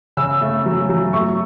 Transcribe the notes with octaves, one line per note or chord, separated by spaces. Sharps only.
C#3 E6
A3
F#3
F#3
A3 C#6